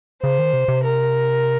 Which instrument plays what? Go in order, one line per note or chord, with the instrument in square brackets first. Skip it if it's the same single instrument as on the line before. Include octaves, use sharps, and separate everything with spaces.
[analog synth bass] C#3 [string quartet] C5
[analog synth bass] D#3
C3
C3
[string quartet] A#4